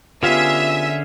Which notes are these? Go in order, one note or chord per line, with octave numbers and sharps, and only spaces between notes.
D3 B3 C#4 F4 G4 G#4 E5